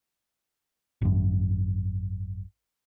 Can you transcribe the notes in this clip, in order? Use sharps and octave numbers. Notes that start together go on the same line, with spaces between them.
G#1 F#2